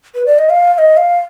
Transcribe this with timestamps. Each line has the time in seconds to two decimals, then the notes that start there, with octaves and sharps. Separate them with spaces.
0.15 B4
0.26 D5
0.39 D#5
0.50 F5
0.74 F5
0.78 D#5
0.97 F5